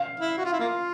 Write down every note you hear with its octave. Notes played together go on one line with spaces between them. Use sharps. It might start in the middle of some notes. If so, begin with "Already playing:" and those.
Already playing: F5
E4
F#4
F4
E4
A#3 F4